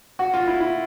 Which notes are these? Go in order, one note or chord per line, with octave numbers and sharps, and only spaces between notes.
F#4
F4
E4
E4